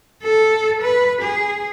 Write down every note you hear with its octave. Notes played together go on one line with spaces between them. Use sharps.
A4
B4
G#4